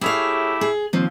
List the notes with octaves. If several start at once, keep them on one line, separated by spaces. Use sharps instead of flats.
A3 E4 G4 G#4 C#5 F5
G#4
D#2 F3 C4